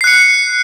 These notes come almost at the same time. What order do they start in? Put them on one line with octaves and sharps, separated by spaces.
C7 F#6 C#7